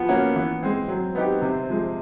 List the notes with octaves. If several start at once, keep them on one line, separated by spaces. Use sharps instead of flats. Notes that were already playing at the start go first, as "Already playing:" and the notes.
Already playing: F3 B3
A#3 C#4 F#4
E3
G#3 C4
F#3 C4
B3 D#4 G4
C3
F3 G#3